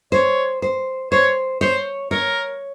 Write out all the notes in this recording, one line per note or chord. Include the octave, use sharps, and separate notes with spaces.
C5 C#5
C5
C5 C#5
C5 C#5
A#4 C#5